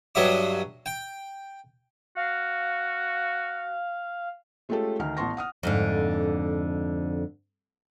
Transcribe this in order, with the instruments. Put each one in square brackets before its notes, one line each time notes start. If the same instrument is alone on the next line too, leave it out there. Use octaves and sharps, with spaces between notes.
[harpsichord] G2 F#3 D#5 E5 D6
G5
[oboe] F#4 [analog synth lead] F5
[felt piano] G#3 A3 C#4 F4 G4 A4
D2 D#3 A#5 F6
A1 B3 A5 C6 C#6 A#6
F#5 D#6 F6
[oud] F2 G#2 D3